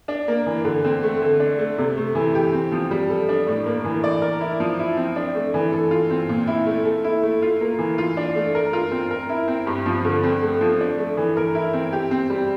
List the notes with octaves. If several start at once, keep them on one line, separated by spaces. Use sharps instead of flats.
D4
A#3
E3
D3
C4
A3
D3
D4
A3
C3
A3
E3
G4
C4
F3
G3
A4
D4
A2
A#3
E3
D5
A#4
E4
F3
E4
C4
D4
A3
E3
A4
F4
C4
A#2
E4
A3
A4
E4
A3
F4
A#3
E3
F4
D4
A3
A#4
F4
C4
A#4
E4
C4
G2
F3
D3
C4
A3
F3
D4
A3
E3
A#4
E4
C4
G4
C4
G3